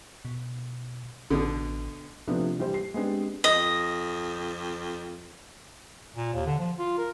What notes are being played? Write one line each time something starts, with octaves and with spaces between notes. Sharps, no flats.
B2
A1 B2 D3
C3 F3 A3 B3 D4
E3 G3 G4 C5
C7
G#3 B3 C4 D4 G4
F2 D#5
A#2
D#2
D3
F3
F4
A#4